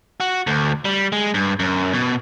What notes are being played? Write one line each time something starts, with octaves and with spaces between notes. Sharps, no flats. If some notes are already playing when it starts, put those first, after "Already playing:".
F#4
D2
G3
G#3
G2
F#2
B2